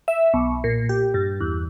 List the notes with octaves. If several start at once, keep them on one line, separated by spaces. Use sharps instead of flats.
E5
B1
A#2
G4
G2
E2